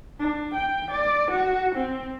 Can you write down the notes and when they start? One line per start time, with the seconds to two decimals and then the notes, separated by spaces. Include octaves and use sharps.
0.19 D4
0.54 G5
0.91 D5
1.31 F#4
1.75 C4